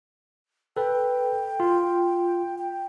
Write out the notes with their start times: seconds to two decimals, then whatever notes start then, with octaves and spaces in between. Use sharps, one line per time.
0.76 A4 B4 G5
1.60 F4
2.58 G5